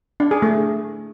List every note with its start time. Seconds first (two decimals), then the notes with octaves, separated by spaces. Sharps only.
0.20 D4
0.31 G#4
0.42 A3